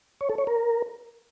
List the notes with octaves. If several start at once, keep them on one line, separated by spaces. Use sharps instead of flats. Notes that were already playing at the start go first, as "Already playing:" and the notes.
C#5
A4
C#5
A#4